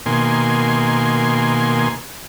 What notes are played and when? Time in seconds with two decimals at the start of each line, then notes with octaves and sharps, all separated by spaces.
0.06 B2 D#3 A#3 G#5 C6